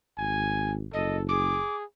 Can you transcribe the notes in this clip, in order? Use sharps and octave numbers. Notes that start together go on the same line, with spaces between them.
G#1 G#5
F#1 A4 D#5
G#4 D6